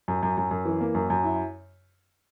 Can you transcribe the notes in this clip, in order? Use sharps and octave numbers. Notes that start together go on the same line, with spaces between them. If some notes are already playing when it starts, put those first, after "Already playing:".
F#2
F#2
F#2
F#2
E3
A#3
F#2
F#2
E4